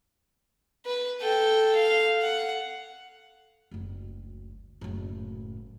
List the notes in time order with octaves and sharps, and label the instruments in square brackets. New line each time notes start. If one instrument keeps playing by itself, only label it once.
[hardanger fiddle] B4
A4 G5
F5
F#5
[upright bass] F#1 D2
F#1 A2